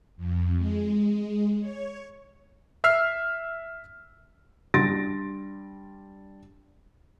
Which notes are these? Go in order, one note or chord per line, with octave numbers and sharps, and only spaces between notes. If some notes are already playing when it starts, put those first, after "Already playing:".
F2
G#3
C#5
E5 E6 F6 C7
G3 D4 C6 A6 A#6 D7